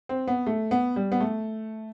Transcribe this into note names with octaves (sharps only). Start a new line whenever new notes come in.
C4
B3
A3
B3
G3
B3
A3